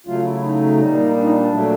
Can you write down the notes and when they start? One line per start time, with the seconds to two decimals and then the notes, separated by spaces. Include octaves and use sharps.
0.06 C#3 F#3 A3 F4
0.25 E4
0.43 D#4
0.79 A#2 G3
1.16 D4
1.23 D#4
1.30 D4
1.52 A#2 F#3 A3